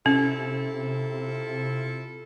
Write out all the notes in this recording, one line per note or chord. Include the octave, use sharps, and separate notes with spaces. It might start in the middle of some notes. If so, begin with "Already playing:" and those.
C3 C#4 E4 F4 A4